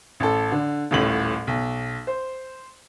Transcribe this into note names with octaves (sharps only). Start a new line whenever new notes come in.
A1 A4
D3
D#1 A1 A2 F#7
B1
C5